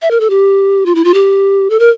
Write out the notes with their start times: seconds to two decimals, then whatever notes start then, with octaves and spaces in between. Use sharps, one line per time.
0.02 E5
0.11 A#4
0.20 A4
0.30 G4
0.86 F4
0.95 E4
1.04 F4
1.14 G4
1.70 A4
1.79 A#4